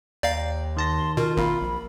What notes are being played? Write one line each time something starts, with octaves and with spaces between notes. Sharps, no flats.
D#2 D5 F5 G5 A#5
D#3 A5 C6 A#6
B2 F4 A#4
G#1 A#3 A#4 F5 B5
A#1